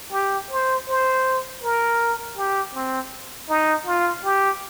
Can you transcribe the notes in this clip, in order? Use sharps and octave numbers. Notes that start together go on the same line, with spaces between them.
G4
C5
C5
A#4
G4
C4
D#4
F4
G4